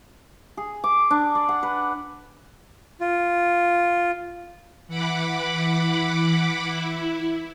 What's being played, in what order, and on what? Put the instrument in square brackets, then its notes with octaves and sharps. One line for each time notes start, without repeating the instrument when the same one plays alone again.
[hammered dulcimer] G#4
D6
D4
D5
F#5
B4
[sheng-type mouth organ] F4
[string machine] E3 F#5 B5 D6
E4